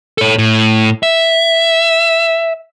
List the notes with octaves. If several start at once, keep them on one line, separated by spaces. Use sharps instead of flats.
A4 C#5
A2
E5